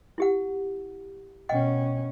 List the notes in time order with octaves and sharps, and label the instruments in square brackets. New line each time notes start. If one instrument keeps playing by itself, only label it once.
[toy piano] E4 G4 F#5
[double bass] B2 C#4 [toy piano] D#5 F#5 G5